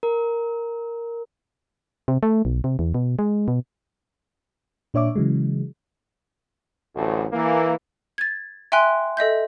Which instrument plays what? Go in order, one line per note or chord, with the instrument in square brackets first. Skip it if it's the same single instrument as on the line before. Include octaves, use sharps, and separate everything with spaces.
[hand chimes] A#4
[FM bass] C3
A3
B1
C3
E2
B2
G#3
B2
[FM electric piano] A#2 D4 C#5 E5 D6
C#3 E3 F#3 G#3
[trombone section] A1 D2
E3 A#3
[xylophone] G#6 A6
E5 G5 G#5 C6 F#6
A4 D#5 E5 G6